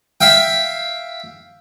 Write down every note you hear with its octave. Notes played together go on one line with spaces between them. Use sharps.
E5 F5 G5